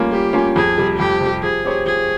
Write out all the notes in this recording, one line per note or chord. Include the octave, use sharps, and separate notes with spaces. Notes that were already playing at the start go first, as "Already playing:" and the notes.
Already playing: G3 A#3 C#4 F4
G3 G4
A#3 C#4 F4
F2 G#4
C3 G3
F2 G4
C3
G3
F3 G#4
C4 G4 C#5
F3 G#4